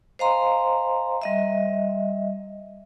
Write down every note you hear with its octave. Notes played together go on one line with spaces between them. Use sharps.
C5 D#5 F5 G#5 A#5 C6
G3 D#5 E5